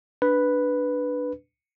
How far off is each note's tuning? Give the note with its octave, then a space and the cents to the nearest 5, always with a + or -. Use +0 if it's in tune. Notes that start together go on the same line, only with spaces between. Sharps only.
D4 +0 B4 +0